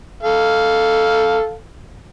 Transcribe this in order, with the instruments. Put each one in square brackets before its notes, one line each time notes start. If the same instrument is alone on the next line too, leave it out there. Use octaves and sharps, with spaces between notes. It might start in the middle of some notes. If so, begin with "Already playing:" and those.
[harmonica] A4 F5